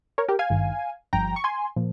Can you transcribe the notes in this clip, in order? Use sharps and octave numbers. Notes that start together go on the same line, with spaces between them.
A#4 C#5
G4 A#4
F5 G#5
G#1 G2 D#3
G1 G2 F3 G5 A#5
C#6
G#5 C6
A#2 F3